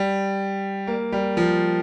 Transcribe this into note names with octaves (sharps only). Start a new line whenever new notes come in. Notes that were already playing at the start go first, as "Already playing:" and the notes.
Already playing: G3
A#3
G3
F3